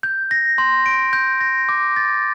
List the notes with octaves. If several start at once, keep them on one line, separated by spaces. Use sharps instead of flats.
G6
A#6
C6
D7
G6
A#6
D6
A6